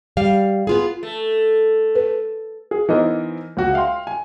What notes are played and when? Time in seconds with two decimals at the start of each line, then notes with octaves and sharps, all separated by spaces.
0.17 G3 F5
0.67 B3 F4 G#4
1.03 A3
1.95 B4
2.71 G#4
2.89 E3 B3 D#4 A#4 C5 D#5
3.57 C#2 F#4
3.74 E5 F5 G5 C6
4.07 G#5